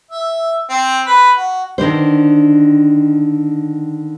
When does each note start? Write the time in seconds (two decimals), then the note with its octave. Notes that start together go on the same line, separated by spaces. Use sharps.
0.11 E5
0.69 C4
1.06 B4
1.37 F#4
1.78 D3 D#3 D4 C5